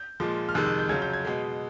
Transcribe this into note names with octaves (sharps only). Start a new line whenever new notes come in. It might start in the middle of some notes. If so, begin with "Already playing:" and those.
Already playing: G6
A#2 F3 G#3
F6
F2 C3 D#3 G#3 F#6
F#6
G6
F2 C#3 F#3 G#6
G6
G#6
B2 G#3